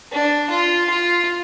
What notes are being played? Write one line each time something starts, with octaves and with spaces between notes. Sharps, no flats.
D4
F4
F4